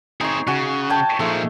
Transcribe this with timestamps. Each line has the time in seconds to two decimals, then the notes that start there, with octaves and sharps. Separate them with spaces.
0.21 C4 D#4 G#4 C#5
0.47 C#3 F#4 G#5
0.90 C#5 G5 A5
1.20 A#2 F3 G#3 A3 D#4